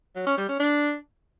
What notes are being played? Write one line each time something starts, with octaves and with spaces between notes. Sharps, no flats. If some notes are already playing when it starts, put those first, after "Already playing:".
F#3
C#4
G3
C#4
D4